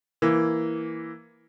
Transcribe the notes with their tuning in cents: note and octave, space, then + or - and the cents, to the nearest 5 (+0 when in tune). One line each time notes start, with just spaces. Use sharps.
E3 +0 A#3 +0